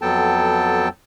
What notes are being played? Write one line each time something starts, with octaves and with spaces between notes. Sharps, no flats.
F2 F#3 B3 A4 G5 A5